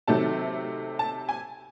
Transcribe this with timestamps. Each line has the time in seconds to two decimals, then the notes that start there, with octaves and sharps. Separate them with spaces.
0.07 C3 D#3 F#3 A3 A5
0.99 A5
1.29 G#5